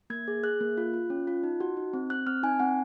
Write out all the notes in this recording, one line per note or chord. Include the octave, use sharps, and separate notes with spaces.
A#3 G#6
G#4
G#4 F#6
A#3
F4
F4
C#4
F4
D#4
F#4
D#4
C4
C4 F#6
C4 F6
D#4 G#5
C4 F#5